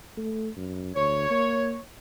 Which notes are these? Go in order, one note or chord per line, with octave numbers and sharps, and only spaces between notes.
A3
F#2
D2 C#5
A#3